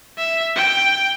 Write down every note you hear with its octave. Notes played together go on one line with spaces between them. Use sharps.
E5
G5